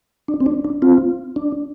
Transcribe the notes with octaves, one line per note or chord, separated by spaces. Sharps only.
D4
C4
D4
D4
C4 F4
D4